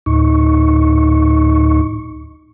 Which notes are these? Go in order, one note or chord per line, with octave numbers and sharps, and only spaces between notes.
D2 A2 D#4 C#6